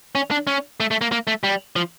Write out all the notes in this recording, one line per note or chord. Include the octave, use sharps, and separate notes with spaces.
C#4
D4
C#4
A3
A3
A#3
A#3
A3
G3
F3